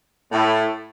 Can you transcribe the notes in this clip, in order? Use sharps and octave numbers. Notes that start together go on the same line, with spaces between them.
A2